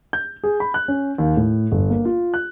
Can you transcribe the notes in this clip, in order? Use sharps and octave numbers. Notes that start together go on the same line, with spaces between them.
G6
G#4
B5
F#6
C#4
D#2
A2
G1
A#3
F4
F#6